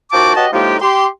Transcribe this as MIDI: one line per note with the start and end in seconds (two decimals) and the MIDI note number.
0.12 0.35 39
0.12 0.35 53
0.12 0.35 66
0.12 0.35 79
0.12 0.35 81
0.12 0.35 86
0.36 0.47 66
0.36 0.47 67
0.36 0.47 71
0.36 0.47 73
0.36 0.47 75
0.36 0.47 81
0.53 0.76 45
0.53 0.76 53
0.53 0.76 56
0.53 0.76 58
0.53 0.76 63
0.53 0.76 67
0.82 1.06 67
0.82 1.06 84